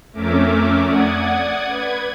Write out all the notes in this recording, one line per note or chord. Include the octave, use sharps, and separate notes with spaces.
F2 A3 C#4 A#4 E5 D6
D5 F#5 D#6 G#6
B4 G#6